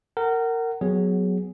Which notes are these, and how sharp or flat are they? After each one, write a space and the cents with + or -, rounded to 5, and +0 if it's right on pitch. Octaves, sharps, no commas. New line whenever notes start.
A#4 -20 F#5 +25
F#3 +0 B3 +10 G#4 -5